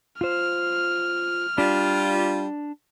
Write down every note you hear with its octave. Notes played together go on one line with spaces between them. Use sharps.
F4 C5 F6
G3 D4 F4